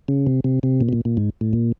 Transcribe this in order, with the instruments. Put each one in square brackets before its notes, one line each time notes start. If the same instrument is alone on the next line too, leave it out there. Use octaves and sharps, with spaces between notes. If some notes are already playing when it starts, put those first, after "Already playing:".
[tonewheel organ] C#3
C3
C3
C3
A#2
B2
A#2
A#2
G#2
A2
A#2